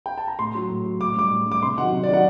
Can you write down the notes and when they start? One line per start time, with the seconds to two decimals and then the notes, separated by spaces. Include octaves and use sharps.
0.06 G5
0.18 A5
0.28 A#5
0.39 A2 C6
0.55 F#3
0.70 A2
0.86 F#3
1.00 A2 D6
1.17 G3 D6
1.31 A2
1.46 G3
1.52 D6
1.62 C3 C6
1.78 D#3 F#5
1.82 F#3
1.92 C3
2.04 D5
2.09 D#3 F#3 F#5